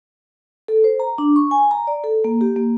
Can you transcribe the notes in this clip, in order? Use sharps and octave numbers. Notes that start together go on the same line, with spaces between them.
A4
C5
A#5
D4
C#6
G#5
A#5
D5
A4
A#3
G4
A#3